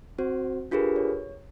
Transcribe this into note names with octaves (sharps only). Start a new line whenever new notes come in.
C4 F#4 C5
D4 F4 G4 G#4 A#4 B4
C#5